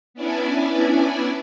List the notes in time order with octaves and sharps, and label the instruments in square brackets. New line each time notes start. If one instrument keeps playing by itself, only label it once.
[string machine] B3 C#4 D4 E4 D5 G#5